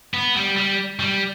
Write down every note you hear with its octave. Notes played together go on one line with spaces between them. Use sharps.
B3
G3
G3
G3